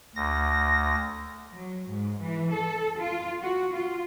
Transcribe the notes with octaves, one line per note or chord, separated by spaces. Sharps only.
D2 A#6
F#3
G#2
E3
A4
F4
F#4
F4